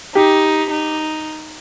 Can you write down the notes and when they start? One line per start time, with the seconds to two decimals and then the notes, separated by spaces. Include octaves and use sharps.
0.15 D#4 G4
0.71 D#4